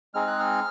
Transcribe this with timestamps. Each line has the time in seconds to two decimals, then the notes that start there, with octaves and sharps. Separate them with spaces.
0.14 G#3 C4 D#4 G#4 F6
0.27 F#6
0.40 F6